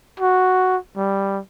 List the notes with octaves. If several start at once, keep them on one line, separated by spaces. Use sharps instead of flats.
F#4
G3